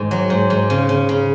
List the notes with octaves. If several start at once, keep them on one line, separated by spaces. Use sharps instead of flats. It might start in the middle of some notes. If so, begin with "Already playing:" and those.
Already playing: G#2 D#3
F#3
G#2
G#2
C#3
C#3
C#3